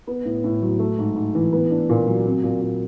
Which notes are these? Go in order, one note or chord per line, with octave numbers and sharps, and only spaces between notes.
B3
A2
A2
F#3
A3
G#2
G#2
E3
B3
D4
A#2
F#3
C4
A#2
A#2